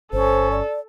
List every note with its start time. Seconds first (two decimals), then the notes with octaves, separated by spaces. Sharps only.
0.13 G1 C#4 A4 C5
0.51 D5